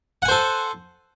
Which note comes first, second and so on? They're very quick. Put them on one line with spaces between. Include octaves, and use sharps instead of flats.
F#5 G#5 C5 A4